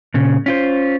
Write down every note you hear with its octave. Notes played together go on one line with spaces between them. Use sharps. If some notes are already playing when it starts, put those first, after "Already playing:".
A#2 C#3
C#4 F4 C5